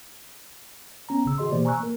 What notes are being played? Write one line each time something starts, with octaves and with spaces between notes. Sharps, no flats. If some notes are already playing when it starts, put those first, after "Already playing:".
B3 C#4 A#5
A#1 C#3 E6
D#3 F#4 G#4 D#5 C6
B2 E3 A#3 G4 C5 D5
G#5 A#5 C#6 E6 F#6
A#3 A#4